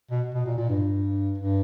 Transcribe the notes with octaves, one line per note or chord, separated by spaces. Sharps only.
B2
B2
A#2
A#2
G2
G2